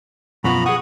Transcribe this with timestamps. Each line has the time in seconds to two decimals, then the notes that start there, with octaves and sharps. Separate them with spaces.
0.44 F#2 B2 F3 F#4 A#5 B5
0.66 G#4 F#5 C#6 D#6 F#6